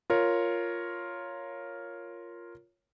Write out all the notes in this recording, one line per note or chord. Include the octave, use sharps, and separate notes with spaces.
F4 A#4 C#5